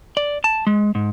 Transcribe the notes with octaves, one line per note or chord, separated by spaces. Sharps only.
D5
A5
G#3
G#2